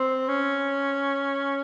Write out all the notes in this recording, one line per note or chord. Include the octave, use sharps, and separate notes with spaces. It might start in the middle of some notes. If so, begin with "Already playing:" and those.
Already playing: C4
C#4